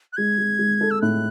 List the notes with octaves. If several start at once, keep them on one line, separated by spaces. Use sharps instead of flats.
F#6
G#3 G#6
G#3
G#3
A4
E6
A2 F#6